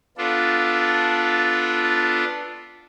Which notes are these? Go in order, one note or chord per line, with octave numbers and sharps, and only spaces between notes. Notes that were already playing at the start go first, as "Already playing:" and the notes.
B3 D4 F4 A4